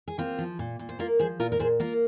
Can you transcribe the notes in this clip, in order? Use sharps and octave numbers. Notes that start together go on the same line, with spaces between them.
G#4
A#3 C4 F4
F3
A#2
A#2
C5
A#3 F4 A#4
F3 G#4 C5
A#2 F4 A#4
A#4
A#2 G#4 C5
A#3 F4 A#4